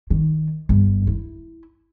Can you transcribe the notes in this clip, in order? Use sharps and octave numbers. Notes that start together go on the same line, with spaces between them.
D#3
G1
E4